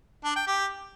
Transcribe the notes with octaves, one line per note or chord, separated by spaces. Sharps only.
D4
G5
G4